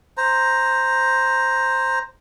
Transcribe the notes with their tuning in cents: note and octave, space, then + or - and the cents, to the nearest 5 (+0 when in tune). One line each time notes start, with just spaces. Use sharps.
C5 +0 A#5 +0